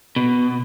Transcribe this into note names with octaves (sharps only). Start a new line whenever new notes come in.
B2